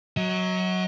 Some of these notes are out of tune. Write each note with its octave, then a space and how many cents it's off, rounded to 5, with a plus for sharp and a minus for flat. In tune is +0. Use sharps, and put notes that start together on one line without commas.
F#3 +0 D#5 +40